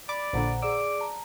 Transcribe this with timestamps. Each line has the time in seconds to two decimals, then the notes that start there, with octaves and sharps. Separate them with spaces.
0.09 D5 B5 D6
0.33 A#1 A#2 D3 C5 F#5 A#5
0.62 G#4 D5 D6 E6
1.01 A5 A#5